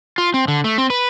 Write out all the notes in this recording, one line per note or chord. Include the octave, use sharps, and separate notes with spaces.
F4
C4
D3
A3
C4
B4